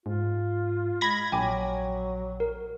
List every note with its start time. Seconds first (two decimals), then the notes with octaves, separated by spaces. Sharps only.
0.06 G#2 F4
1.01 G#3 B5 G#6 A#6
1.32 A#1 F#3 G5 G#5 D6
2.40 A#4